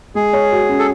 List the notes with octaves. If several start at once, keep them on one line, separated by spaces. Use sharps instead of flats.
G#3 G#4
C#5
F#4
C#4
A4